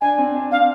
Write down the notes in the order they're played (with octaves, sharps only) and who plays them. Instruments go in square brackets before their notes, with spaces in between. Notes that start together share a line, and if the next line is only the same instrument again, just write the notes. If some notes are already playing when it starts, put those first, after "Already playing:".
[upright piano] D4 [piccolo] G#5
[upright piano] C4
D4
[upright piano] C4 [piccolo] F5